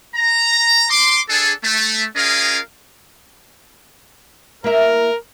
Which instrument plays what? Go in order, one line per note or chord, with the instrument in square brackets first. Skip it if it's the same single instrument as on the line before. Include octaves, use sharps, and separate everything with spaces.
[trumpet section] A#5
C6 D6
D4 G#4 A4
A3
C#4 F4 G#4 A#4 D#5 F5
[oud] A#3 E4 [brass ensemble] A#4